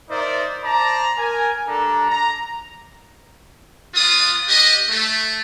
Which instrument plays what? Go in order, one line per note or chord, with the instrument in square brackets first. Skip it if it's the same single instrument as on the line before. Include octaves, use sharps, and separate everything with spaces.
[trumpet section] D#4 A#4 C5 D5 E5
C5 D5 A5 A#5
A#4 G#5
G3 D4 A4 A#5
A#5
B3 F4 D5 D#6
D4 G4 D#5
A3